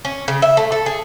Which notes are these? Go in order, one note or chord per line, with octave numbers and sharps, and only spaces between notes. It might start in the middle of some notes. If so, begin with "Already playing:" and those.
C#4
C#3
E5
A3
A4
G#4